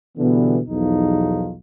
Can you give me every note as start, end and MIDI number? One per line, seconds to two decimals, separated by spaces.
0.17 0.59 47
0.17 0.59 50
0.17 0.59 52
0.17 0.59 55
0.17 0.59 59
0.68 1.54 35
0.68 1.54 40
0.68 1.54 53
0.68 1.54 63
0.68 1.54 65